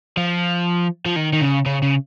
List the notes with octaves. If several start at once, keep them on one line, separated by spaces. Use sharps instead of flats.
F3
F3
D#3
D#3
C#3
C#3
C#3